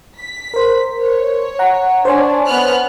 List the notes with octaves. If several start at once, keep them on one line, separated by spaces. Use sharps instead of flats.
B6
A#4 C5
C#5
F#5 A#5
D4 C5 C#5 G#5
B3 F6 F#6